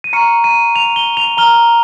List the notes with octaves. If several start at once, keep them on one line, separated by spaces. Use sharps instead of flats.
D#7
A#5 C#6 F6 C#7
D#7
F7
G7
F7
A#5 F6 G7